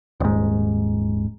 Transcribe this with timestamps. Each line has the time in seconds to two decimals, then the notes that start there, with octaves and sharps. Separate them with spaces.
0.20 D#1 G#2